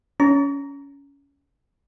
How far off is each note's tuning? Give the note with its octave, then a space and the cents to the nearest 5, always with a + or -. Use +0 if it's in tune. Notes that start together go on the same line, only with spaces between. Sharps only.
C#4 +20 A#5 +0 C#6 +45